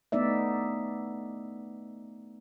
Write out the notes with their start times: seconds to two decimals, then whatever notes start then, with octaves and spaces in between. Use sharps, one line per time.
0.12 A3 B3 D#4 D5 E5